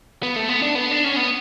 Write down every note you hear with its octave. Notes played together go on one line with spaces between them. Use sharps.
B3
A3
B3
D4
B3
D4
C#4
B3